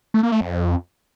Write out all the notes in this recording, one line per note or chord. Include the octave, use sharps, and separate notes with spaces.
A3
A#3
A3
F2